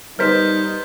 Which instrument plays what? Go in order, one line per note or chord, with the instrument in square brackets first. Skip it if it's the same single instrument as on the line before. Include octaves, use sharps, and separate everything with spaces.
[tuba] G3 [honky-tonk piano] B3 A#4 C5 [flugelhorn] D#4 [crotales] F6 G6 B6